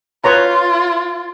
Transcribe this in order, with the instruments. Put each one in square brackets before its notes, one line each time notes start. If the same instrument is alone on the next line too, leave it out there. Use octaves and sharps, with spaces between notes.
[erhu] F4 [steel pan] B4 C#5 A#5